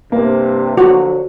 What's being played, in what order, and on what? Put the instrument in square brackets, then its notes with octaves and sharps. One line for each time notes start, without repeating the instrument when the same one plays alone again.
[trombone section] G2 C3 [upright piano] A#3
[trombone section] D3 F3 F#3 [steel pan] F#4